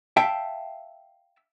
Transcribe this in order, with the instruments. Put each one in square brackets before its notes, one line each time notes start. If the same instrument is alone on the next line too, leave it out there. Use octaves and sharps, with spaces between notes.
[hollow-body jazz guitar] E5 F5 G5 A5